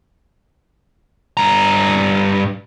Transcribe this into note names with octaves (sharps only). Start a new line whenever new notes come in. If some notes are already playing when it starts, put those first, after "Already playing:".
G2 A#5